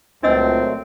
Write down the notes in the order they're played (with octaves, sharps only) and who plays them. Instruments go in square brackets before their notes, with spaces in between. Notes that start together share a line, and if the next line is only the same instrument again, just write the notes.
[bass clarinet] C#2 [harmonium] A#2 F#3 A3 [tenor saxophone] C4 [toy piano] D4 D#5 E6